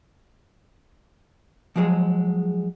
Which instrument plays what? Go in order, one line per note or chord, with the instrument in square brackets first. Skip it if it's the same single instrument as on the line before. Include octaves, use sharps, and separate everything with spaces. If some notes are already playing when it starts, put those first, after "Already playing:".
[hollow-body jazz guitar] F3 F#3 G#3 G#4 C5